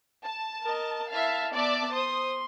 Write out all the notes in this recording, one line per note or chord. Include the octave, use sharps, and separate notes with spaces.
A5
A#4 D#5
E4 E5 F5 A5
B3 D5 E5 A5 D6
C5 C6 D#6